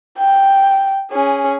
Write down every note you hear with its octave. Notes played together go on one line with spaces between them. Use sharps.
G5
C#4 G#4